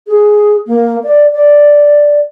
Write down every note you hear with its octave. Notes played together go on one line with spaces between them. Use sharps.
G#4
A#3
D5
D5